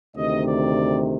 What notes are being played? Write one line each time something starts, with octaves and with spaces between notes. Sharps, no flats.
D2 C3 D#3 D#5
D5